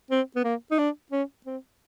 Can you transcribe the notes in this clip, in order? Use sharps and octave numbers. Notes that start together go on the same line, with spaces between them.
C4
B3
A#3
D#4
D4
C#4
C4